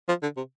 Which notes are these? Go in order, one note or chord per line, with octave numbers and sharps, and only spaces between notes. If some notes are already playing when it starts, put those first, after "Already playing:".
F3
D3
C3